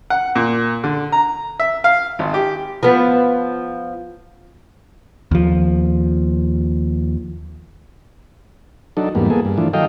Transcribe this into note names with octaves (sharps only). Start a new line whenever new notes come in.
F#5
A#2
D3
A#5
E5
F5
G#1
G4
F3 B3
D#2 F3
F#3 D4 D#4 A4
E2 G#2 G3 A#3 B3
A#3 B3 G#4 A4
G2
E3 F3 A3 D4
D#3 F#3 A4 D#5 F5 G5